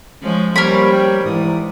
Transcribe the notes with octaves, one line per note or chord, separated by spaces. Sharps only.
F3 G#3 C#4
G3 A#3 C#4 A#4 C5 C#5 B5
C#5 G5
G#2 E3 D5 D#6